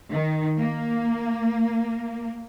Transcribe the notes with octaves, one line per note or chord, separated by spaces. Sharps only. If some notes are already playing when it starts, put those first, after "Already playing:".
D#3
A#3